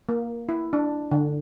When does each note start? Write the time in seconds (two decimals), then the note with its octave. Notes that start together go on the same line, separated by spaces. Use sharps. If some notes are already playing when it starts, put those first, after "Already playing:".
0.09 A#3
0.49 E4
0.73 D4
1.11 D3